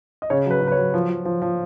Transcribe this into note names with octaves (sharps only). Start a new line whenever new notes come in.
D#5
C#3 C#5
F#3 B4
C#3
B4
C#5
F#3
F3
F3
F3
F3